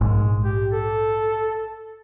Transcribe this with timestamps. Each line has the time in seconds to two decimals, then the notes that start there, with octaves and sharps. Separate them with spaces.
0.01 A#1 G#2 G#3
0.44 G4
0.72 A4